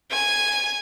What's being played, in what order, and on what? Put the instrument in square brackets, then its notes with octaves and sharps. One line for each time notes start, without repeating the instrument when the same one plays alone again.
[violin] G#5